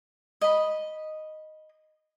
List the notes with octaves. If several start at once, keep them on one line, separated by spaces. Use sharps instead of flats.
D#5 B5